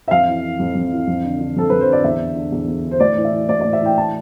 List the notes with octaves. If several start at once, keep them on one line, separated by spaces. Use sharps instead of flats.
E5
F2 F5
E3
E3
F2
F2
E3
F2
D3
D3
F2 A4
F2 B4
C5
D3 D5
E2 E5
D3
D3
E2
E2
D3
C5
A2 D5
E3
E5
E3
A2 D5
D5
A2
E5
E3 G5
A5